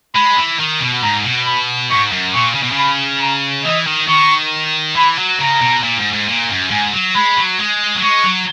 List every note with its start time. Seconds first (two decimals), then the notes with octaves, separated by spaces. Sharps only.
0.15 G#3 B5
0.36 E3
0.59 D#3
0.80 B2
1.02 G#2 A#5
1.24 B2
1.46 B5
1.90 G#2 C#6
2.12 F#2
2.34 A#2 C#6
2.55 C#3
2.63 B2
2.72 C#3
2.78 B5
3.21 A#5
3.65 E3 D#5
3.87 D#3
4.08 D#3 C#6
4.96 E3 B5
5.18 F#3
5.39 C#3 A#5
5.61 B2
5.83 A#2
5.98 G#2
6.14 G#2
6.28 A#2
6.50 F#2
6.71 G#2 G#5
6.93 F#3
7.15 G#3 B5
7.37 F#3
7.59 G#3
7.96 F#3
8.02 G#3 C#6
8.24 F#3